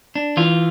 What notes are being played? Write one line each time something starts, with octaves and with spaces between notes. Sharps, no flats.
D4
E3 F4